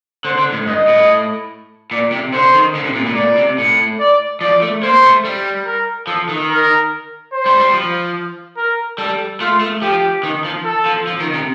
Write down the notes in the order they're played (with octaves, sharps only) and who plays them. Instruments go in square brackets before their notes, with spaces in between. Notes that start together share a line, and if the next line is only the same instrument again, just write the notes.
[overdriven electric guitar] D3 [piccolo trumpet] C5
[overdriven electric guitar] D3
A2
[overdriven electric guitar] G2 [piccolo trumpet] D#5
[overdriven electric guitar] A2
[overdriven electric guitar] A#2 [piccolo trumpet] D5
[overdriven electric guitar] C3
[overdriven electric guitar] D3 [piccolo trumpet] C5
[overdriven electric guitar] D#3
D3
C3
A#2
A2
[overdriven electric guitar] A#2 [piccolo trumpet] D5
[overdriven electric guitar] C3
A2
[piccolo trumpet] D5
[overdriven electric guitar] F3 [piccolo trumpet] D5
[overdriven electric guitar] A3
[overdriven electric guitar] A#3 [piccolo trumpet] C5
[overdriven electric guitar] A3
G3
[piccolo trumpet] A#4
[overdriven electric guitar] F3 [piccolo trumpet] A4
[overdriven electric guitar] D#3
[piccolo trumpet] A#4
C5
[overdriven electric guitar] G3
G3
F3
[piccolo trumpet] A#4
[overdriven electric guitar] G3 [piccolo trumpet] A4
[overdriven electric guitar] A3 [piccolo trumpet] F4
[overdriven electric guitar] A3
[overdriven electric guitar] F3 [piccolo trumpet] G4
[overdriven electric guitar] D#3
F3
[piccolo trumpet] A4
[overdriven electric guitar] F3
F3
D#3
C3